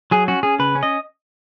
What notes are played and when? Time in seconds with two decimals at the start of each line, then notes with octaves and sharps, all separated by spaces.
0.11 F#3 G#4
0.28 C#4 F#4
0.43 C#4 G#4
0.59 C#3 B4
0.75 C#4
0.83 D#5